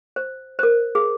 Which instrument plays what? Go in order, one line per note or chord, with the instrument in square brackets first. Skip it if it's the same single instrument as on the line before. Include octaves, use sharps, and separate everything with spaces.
[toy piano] C5
C5
A#4
G#4